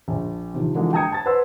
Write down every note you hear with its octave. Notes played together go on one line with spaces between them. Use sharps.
A#1
C3 D#3 F3
D3 E3 F3 G#3 A#3 F#4
G5 A5 A#5 D#6 G#6 C#7
A5 A6
B4 C5 F#5 A5 C6 E6